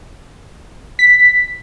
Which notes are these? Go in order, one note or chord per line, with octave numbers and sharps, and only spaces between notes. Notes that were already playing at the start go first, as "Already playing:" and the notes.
B6